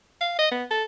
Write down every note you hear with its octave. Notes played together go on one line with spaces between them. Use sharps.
F5
D#5
B3
A4